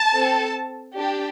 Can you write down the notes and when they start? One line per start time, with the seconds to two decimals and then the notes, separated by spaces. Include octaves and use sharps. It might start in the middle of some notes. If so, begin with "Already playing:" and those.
Already playing: A5
0.15 C4 A4
0.96 D4 G4